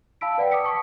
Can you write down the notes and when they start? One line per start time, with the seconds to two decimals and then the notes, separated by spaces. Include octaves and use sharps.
0.21 F5 A5 B5 E6 B6 D7
0.38 B4 D5 F#5 G5
0.51 D6 D#6 B6 C#7
0.64 A5 C#6 D#6